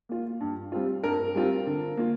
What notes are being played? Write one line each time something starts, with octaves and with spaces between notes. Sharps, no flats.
A#3 F4
G2
G3 C4 F4
G2 A#4
G3 C4 F4
D3
A#3 F4